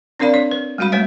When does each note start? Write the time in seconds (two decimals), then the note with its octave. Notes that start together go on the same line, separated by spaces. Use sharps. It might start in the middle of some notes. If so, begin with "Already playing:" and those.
0.20 C4 D4 A#4 D5 F5 B5
0.34 D4 C#5
0.51 B4
0.78 G3 G#3 F#4 F5 B5
0.92 G#3 A3 B4 C#5 E5